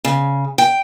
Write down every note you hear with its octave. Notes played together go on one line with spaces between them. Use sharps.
C#3
G5